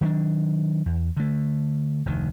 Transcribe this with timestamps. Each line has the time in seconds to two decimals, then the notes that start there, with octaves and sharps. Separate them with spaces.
0.01 D#3 F#3 A3 D4
0.86 E2
1.17 D3 A3
2.06 F1 D2 D#3